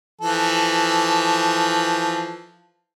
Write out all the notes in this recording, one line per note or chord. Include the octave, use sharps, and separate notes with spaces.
E3 F3 A4